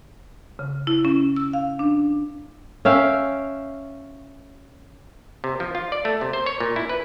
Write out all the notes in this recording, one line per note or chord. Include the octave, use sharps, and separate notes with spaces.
C#3
E4
C#4
E6
F5
D4
C#4 E5 F5 G5
C3
F3
F4
D5
A3
C3
C5
C#5
A#2
E4
B4